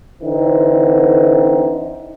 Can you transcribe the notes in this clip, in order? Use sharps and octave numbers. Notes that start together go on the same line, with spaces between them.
D3 E3 C4 D#4